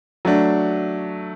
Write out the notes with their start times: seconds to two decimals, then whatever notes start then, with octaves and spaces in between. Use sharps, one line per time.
0.25 F#3 A3 D4